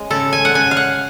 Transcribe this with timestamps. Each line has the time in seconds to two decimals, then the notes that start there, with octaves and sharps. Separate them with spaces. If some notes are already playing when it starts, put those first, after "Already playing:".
Already playing: G#3 C#4
0.10 C#3 A4
0.33 G#5
0.45 F#5
0.54 C#3 G#5
0.71 F5
0.77 F#5